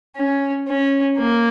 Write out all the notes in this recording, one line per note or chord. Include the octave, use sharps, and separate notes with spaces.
C#4
C#4
A#3